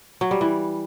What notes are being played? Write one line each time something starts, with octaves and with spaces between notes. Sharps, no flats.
F#3
G3
E3